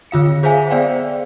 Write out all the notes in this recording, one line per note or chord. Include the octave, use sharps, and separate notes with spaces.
D3 F4 F5 C#7
G#4 C5 E5 F5 G#5
B3 G#4 C5 D5 F5 G5